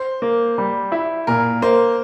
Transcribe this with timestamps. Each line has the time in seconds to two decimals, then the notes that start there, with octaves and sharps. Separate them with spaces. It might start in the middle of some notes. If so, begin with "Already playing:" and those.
Already playing: C5
0.22 A#3
0.58 G3
0.92 E4
1.27 A#2 A#4
1.62 A#3 C5